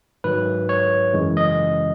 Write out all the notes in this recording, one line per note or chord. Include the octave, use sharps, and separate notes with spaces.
G#2 D#3 F#3 B4
C#5
F#2 C#3 E3 G#3
D#5